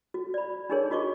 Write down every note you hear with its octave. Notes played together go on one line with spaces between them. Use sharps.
F#4
D5 B5
D4 D#4 G4 G#4 A#4 C#5
F4 F#4 D#5 C#6 D6